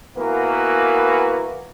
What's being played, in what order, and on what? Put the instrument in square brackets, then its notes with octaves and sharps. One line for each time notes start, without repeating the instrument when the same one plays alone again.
[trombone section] E3 A#3 B3 F#4 A#4 B4